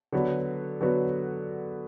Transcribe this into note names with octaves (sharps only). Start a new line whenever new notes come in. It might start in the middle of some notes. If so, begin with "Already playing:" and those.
D3 F#3 B3 F#4 B4
D3 F#3 B3 F#4 B4